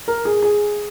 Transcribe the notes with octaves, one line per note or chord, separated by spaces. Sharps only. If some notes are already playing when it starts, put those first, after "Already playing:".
A#4
G#4
G#4